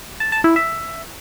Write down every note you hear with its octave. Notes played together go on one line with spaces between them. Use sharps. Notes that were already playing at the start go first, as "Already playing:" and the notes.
A5
A5
E4
E5